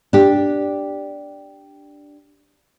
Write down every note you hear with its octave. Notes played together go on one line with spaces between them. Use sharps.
D4 G4